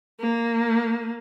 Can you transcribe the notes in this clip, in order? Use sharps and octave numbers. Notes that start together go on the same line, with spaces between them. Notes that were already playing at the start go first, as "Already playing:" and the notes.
A#3